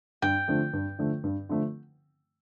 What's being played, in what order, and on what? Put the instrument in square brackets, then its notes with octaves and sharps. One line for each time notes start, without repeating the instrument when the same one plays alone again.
[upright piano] G2 [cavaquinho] G5
[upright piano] D3 F3 A3
G2
D3 F3 A3
G2
D3 F3 A3